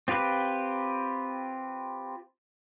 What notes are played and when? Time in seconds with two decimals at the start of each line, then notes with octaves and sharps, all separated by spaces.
0.08 C4 F4 G4 B4